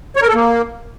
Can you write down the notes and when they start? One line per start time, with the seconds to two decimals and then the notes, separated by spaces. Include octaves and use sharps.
0.16 C#5
0.22 A#4
0.28 A4
0.34 A#3